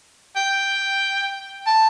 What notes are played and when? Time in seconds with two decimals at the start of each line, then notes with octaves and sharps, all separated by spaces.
0.36 G5
1.66 A5